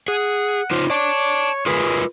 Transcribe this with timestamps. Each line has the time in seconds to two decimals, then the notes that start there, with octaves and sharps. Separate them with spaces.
0.08 G#4 F#5
0.71 D#4 F4 C5
0.90 C#5 D5 A5
1.66 F4 G#4 A#4 B4